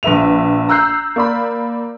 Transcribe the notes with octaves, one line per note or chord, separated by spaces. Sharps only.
A#1 B4 E5 F7
A#5 E6 F#6 G6 C7
A#3 D5 B5